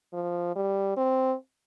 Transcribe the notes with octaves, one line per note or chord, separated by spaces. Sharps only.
F3
G3
C4